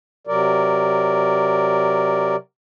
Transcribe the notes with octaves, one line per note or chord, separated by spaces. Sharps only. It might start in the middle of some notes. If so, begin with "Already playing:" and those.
C3 F#3 A#4 D5